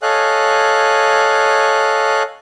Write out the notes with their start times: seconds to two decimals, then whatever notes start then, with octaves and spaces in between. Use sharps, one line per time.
0.02 A4 C#5 D#5 F5 G#5 F#6